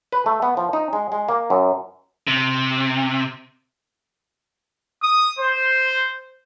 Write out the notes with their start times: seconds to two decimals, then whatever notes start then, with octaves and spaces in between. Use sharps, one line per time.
0.12 B4
0.26 A3
0.42 B3
0.57 F3
0.73 D#4
0.93 G#3
1.12 G#3
1.29 A#3
1.50 F#2
2.27 C3
5.02 D#6
5.38 C5